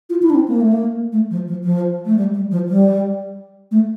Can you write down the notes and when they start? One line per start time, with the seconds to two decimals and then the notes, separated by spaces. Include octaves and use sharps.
0.10 F4
0.22 E4
0.30 D4
0.35 C4
0.48 A#3
0.61 A3
0.73 A#3
1.12 A3
1.31 F3
1.47 F3
1.64 F3
2.05 A3
2.17 G3
2.34 G3
2.51 F3
2.68 G3
3.71 A3